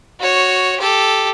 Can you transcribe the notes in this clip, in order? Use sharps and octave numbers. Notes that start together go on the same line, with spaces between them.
F#4 C#5
G4 A4